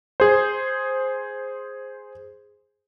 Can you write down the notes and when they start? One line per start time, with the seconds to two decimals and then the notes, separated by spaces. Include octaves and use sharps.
0.20 G#4 C5